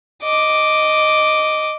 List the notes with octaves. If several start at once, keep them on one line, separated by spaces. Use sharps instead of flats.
D#5 D6